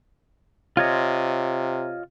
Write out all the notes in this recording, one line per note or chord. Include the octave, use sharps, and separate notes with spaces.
C3 F4 C#5 D#5